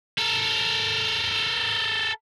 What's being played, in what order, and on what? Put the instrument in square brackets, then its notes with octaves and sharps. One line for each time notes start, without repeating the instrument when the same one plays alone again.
[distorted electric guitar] A4 A#4